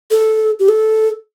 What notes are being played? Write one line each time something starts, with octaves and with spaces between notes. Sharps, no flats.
A4
G4
A4